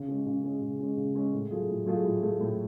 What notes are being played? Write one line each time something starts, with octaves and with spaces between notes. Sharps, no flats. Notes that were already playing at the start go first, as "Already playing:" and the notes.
Already playing: C#3
G#3 C#4
C#3
G#3 C#4
C#3
G#3 C#4
C#3
G#3 C#4
A2
F#3 A3 F4 G#4
A2
F#3 A3 F4 G#4
A2
F#3 A3 F4 G#4
A2